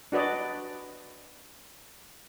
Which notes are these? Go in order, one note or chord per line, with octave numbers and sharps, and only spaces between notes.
D4 F#4 B4 D5 D#5